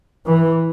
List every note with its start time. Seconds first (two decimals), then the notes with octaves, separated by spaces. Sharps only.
0.26 E3